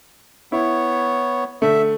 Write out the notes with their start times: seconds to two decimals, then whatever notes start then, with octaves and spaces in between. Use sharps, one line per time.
0.52 B3 E4 C#5
1.62 D3 A3 E5